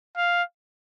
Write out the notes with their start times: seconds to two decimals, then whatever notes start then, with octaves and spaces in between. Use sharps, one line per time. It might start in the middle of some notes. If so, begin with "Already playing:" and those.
0.17 F5